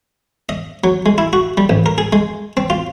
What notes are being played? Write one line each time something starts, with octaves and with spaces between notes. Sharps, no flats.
D#5
F#3
G#3
E4
F#4
G3
A1
A#4
G#4
G#3
C4
F4